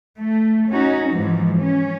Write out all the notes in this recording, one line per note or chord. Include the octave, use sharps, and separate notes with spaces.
A3
C#4 D#4 F#4
G#2 E3 F3
C#4